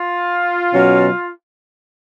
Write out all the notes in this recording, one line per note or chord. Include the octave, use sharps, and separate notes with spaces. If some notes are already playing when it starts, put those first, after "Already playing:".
Already playing: F4
B2 F#3 C#4